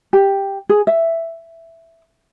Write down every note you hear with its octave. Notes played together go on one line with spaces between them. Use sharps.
G4
G#4
E5